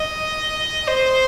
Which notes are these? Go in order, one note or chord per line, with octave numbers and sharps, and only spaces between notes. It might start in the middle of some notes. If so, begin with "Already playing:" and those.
Already playing: D#5
C5